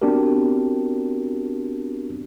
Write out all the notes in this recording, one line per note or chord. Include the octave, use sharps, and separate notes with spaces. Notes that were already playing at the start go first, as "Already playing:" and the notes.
B3 C4 D4 F#4 G4 A#4